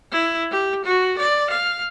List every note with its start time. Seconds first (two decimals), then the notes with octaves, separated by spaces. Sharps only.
0.12 E4
0.51 G4
0.85 F#4
1.18 D5
1.50 F5